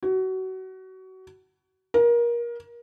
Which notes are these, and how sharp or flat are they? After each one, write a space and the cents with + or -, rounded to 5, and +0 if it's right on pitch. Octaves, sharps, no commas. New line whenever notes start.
F#4 +25
A#4 +25